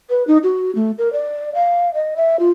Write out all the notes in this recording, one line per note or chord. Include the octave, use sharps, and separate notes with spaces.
B4
D#4
F#4
A3
A#4
D5
F5
D#5
E5
F4